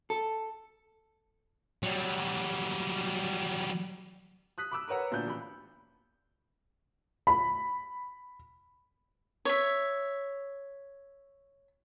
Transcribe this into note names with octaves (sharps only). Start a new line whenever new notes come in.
A4
F#3 G3
D#6 F#6 B6
B5 D6 E6
A#4 B4 C#5 F#5 A#5
D2 A#2 B3 D4 G6
A1 B5
B5
C#5 E5